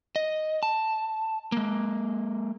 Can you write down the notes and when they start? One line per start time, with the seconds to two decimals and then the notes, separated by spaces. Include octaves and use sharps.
0.16 D#5
0.63 A5
1.52 G#3 A#3